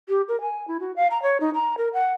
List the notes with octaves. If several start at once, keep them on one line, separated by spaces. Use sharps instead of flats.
G4
A#4
G#5
E4
F#4
F5
A#5
C#5
D#4
A#5
A#4
F#5